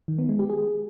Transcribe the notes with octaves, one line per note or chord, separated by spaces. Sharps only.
D#3
B3
G#3
G4
G#4